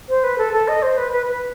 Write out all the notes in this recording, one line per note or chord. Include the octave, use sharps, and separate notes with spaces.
C5
B4
A4
A4
D#5
C5
B4
B4
B4